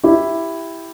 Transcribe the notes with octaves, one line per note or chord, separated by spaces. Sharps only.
E4 G4